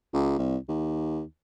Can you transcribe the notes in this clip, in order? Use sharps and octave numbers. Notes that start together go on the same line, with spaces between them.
C#2
C2
D#2